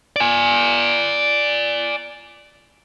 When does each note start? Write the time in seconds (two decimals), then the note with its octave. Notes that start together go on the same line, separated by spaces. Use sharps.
0.16 D5 G#5